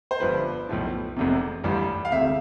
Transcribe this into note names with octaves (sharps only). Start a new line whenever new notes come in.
C5
G1 G2 F3 B4
B1 A2 F3
F1 E2 C3
A1 G2 E3 G3
F5
E1 D2 C3 E5